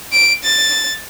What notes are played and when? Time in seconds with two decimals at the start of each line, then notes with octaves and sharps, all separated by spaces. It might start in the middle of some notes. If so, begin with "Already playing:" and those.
0.13 D7
0.44 A6